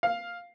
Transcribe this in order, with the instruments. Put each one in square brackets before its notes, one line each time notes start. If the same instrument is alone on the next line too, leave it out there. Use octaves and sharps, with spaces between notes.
[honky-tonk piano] F5